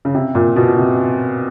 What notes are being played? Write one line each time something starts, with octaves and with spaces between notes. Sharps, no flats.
C#3
C3
A#2
B2
C3